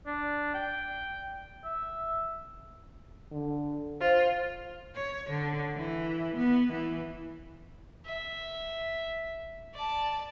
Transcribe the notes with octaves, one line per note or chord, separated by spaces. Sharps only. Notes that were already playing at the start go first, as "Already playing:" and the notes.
D4
G5
E5
D3
F4 C5
C#5
D3
E3
B3
E3
E5
D5 A5